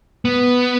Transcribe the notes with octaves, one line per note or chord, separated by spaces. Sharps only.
B3